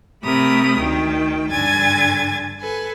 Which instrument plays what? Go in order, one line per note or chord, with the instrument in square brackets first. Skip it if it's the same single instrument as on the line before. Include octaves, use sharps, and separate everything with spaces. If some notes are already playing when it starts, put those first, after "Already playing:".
[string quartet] C3 A3 A#4 B5 D#6
D2 D#3 G5
G2 D3 G#5 G#6 A6
A4 B4 G#5